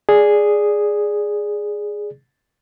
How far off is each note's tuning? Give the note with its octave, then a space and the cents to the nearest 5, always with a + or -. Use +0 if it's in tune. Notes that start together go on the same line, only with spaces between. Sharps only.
G#4 +0 D5 +0